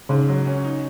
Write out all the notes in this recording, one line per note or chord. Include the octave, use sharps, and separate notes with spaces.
G#2 C#3
F#3
C#4
D#4